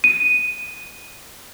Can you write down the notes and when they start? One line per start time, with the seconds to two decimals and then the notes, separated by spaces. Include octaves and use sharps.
0.04 D#7